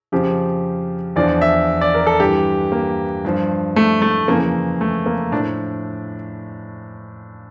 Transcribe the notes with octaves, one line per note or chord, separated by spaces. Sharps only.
F2 C#3 F3 G4
E2 D3 F3 D5
E5
D5
A#4
A4
G2 E3 G4
A#3
G2 F3
A3
A3
F2 C#3 E3 A#3
A3
A#3
A2 F3 D4